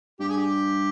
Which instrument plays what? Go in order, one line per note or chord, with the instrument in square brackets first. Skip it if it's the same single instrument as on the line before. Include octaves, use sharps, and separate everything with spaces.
[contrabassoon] G2 [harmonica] G4
[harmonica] G#4
G4